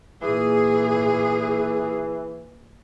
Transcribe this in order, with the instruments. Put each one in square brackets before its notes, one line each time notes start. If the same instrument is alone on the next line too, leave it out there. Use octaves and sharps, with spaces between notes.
[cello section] A#2 G#4 [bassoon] E3